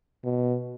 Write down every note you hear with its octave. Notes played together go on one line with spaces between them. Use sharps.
B2